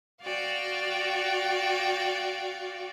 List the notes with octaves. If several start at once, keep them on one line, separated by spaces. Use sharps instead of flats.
F#4 D5 F5 G5